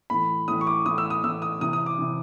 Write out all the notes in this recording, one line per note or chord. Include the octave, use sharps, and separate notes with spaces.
A2 E3 B5
A2 E3 D#6
C#6
D6
A2 E3 D#6
E6
D#6
A2 E3 E6
D#6
C3 E3 D#6
D#6
D6
C3 E3